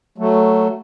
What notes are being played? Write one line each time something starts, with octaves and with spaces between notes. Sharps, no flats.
F#3 A3